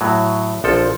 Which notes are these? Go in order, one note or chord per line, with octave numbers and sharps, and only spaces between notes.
A2 F#3
A#1 F3 A4